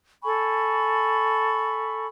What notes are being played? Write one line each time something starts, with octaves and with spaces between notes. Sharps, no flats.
A4 G#5 B5 C#6